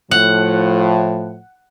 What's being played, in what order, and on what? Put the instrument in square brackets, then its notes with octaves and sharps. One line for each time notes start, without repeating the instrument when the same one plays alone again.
[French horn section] A2 F3 [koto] F#5